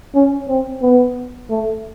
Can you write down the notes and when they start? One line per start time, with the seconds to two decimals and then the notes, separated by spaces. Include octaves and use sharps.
0.15 C#4
0.49 C4
0.82 B3
1.50 A3